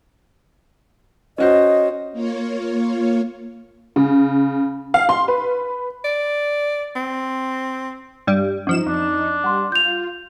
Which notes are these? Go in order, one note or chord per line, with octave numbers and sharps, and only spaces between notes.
C#4 F#4 C5 D#5
A#3 F4 C#5
C#3
F5
C6
B4
D5
C4
G2 G3
F#2 F3 D#4 E7
F2 D4
G3 F#5 C6
F4 G6 F7